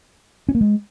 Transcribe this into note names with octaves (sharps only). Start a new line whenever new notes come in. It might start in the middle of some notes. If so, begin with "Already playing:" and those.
C#4
A#3
G#3